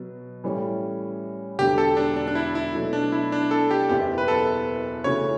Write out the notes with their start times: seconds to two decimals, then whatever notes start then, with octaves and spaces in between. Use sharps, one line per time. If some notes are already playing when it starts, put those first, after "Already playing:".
Already playing: B2 F#3 B3
0.44 A2 E3 G3 C#4
1.59 E1 E2 D3 G4
1.78 A4
1.97 D4
2.16 D4
2.28 D4
2.35 E4
2.55 E4
2.75 B2 F#3 A3
2.93 D4
3.12 E4
3.32 D4
3.51 A4
3.71 G4
3.89 F#1 E2 B2 G4
4.18 B4
4.28 A4
5.04 C#3 E3 A3 C#4 F#4 C#5